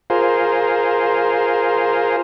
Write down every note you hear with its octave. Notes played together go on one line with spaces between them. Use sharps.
F4 G#4 A#4 C5